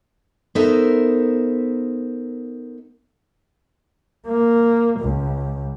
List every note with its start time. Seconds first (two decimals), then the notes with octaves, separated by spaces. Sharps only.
0.55 B3 D#4 A4 A#4 C5 E5
4.27 A#3
5.00 C#2